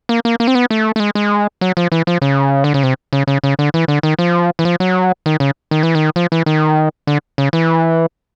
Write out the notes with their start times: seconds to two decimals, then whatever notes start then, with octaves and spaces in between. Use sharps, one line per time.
0.09 A#3
0.25 A#3
0.40 A#3
0.47 C4
0.55 B3
0.70 A3
0.96 A3
1.00 G#3
1.15 G#3
1.61 F#3
1.77 F3
1.92 E3
2.07 F3
2.22 C#3
2.64 D3
2.74 C#3
2.83 C3
3.13 C#3
3.27 C#3
3.44 C#3
3.59 D3
3.74 E3
3.88 D3
4.03 D#3
4.19 F3
4.59 E3
4.65 F3
4.80 F#3
5.26 D#3
5.40 C#3
5.71 D#3
5.83 E3
5.95 D#3
6.16 F3
6.32 E3
6.46 D#3
7.07 D3
7.38 C#3
7.53 E3